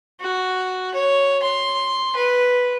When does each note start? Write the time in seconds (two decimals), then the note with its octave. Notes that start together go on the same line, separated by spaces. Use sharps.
0.20 F#4
0.94 C#5
1.42 C6
2.16 B4